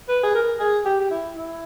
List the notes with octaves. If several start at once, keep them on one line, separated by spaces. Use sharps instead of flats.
B4
G#4
A#4
G#4
G4
G4
E4
E4